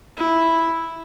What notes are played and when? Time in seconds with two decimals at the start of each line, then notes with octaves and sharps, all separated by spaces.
0.17 E4